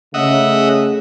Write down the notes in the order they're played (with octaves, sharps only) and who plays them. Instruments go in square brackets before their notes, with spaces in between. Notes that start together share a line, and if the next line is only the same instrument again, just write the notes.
[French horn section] C#3 A3 [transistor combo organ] D#5 E5 F#5